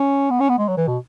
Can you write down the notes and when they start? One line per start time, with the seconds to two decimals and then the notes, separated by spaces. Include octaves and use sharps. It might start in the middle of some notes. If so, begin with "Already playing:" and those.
Already playing: C#4
0.30 B3
0.40 C#4
0.49 B3
0.59 G#3
0.68 F#3
0.77 E3
0.88 B2